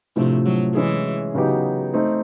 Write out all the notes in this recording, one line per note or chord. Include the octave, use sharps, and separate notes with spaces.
A2 C3 F3 A3 D4
F#3
E3 G#3 C#4 E4 G#4
C#3 F#3 B3 D#4 G4
A3 C4 D#4